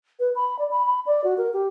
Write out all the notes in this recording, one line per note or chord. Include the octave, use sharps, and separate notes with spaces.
B4
B5
D5
B5
B5
D5
F#4
A#4
G4